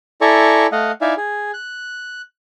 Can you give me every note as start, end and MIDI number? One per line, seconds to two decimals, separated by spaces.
0.21 0.67 64
0.21 0.67 69
0.21 0.67 74
0.21 0.67 80
0.21 0.67 82
0.21 0.67 85
0.72 0.92 57
0.72 0.92 75
0.72 0.92 77
0.72 0.92 78
1.01 1.14 63
1.01 1.14 64
1.01 1.14 74
1.01 1.14 76
1.01 1.14 77
1.01 1.14 80
1.17 1.51 68
1.54 2.22 90